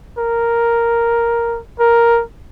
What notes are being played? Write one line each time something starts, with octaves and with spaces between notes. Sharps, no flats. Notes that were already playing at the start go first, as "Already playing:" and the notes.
A#4
A#4